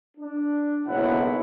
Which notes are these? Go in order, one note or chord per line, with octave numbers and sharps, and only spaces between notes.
D4
F#1 B1 G#2 E4 F#5